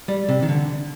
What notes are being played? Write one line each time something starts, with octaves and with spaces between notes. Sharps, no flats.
G3
C3
D#3
D3